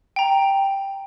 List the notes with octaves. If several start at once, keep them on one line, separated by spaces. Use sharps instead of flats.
G5 A#5